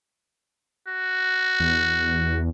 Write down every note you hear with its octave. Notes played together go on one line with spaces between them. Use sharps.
F#4
E2